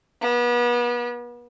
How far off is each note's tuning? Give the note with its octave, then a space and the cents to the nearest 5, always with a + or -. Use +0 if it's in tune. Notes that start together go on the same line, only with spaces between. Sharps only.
B3 -35